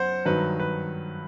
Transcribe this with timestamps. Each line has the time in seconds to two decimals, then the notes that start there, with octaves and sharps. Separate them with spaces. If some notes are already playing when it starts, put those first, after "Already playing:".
Already playing: F#2 C5 F#5
0.25 G2 D#3 F#3 B4
0.60 B4